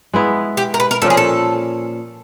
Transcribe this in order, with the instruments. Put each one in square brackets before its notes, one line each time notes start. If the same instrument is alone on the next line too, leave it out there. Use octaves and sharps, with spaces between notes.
[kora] G#3 B3 E4
[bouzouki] G4
A#4
B4
A#4
[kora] A#2 F3 A#3 C#4 [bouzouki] A4
[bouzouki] G#4
A4